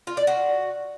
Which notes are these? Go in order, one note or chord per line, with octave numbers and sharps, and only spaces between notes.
F4
D5
F#4